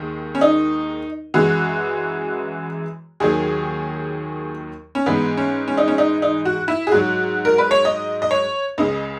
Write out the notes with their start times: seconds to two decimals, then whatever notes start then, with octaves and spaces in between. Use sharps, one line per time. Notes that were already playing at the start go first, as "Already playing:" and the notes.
Already playing: D#2 D#3 G#3
0.35 C#4
0.41 D#4
1.34 F#2 E3 G#3 F#4
3.20 D#2 D#3 F#3 G#4
4.95 C#4
5.06 G#2 E3 G#3 B3
5.37 C#4
5.68 C#4
5.78 D#4
5.88 C#4
5.98 D#4
6.22 D#4
6.45 F#4
6.68 E4
6.87 G#4
6.92 G#2 F#3 F#4
7.45 A#4
7.58 B4
7.71 C#5
7.85 D#5
8.22 D#5
8.31 C#5
8.78 C#2 C#3 G#3 D#5